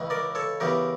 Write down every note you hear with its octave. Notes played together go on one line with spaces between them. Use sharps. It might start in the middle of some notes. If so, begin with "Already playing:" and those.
Already playing: C#2 C#3 E3
A#4 D5
A4 C#5
E2 C#3 E3 G4 A#4